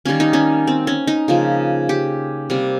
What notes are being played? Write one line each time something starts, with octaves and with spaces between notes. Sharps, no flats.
D#3 G3 A#3 C#4
D#4
C#4
C4
C#4
D#4
C#3 F3 A#3
G4
C3 G3 A#3